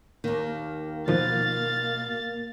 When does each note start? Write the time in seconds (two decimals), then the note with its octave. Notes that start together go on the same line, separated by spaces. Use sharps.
0.24 D#2 D#3 A#3
1.08 B2 D#3 F3 F5 A6